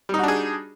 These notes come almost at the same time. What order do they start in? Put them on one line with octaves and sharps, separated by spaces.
G3 D#4 F#4 D4 G#4